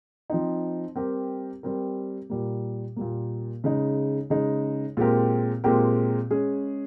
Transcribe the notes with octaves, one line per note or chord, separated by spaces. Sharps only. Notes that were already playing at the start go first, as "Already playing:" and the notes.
F3 C4 D#4
G3 C4 G4 A#4
G3 C4 G4 A#4
A#2 G3 A#3
A#2 G3 A#3
C#3 G#3 D#4
C#3 G#3 D#4
A#2 G#3 C4 G4 A#4
A#2 G#3 C4 G4 A#4
G#3 C#4 G#4